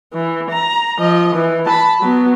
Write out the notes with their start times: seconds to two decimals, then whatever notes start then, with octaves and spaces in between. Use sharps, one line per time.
0.14 E3
0.50 A#5
0.99 F3 D#5
1.35 E3
1.65 A5 B5
2.00 F#3 B3